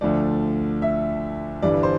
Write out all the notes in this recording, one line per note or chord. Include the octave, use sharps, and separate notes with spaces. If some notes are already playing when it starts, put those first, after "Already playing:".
D2 D3 F3 A3 D5
E5
G1 G2 E3 G3 D5
C5